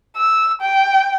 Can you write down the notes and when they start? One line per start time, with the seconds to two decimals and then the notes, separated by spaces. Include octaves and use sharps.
0.16 E6
0.61 G5